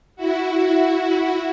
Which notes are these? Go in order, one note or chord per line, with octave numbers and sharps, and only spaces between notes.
E4 F#4